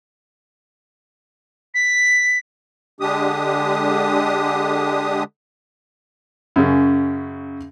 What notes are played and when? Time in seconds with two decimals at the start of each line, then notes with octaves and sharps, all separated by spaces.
1.74 B6
3.01 D3 G#3 D4 G4 D#6
6.56 F#2 C#3